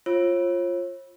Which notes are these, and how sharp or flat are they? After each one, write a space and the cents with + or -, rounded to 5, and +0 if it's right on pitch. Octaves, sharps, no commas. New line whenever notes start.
F4 +0 C#5 -45 E6 +0